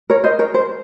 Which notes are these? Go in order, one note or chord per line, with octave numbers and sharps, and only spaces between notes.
A#4 C#5
C5 D#5
A#4 C#5
C5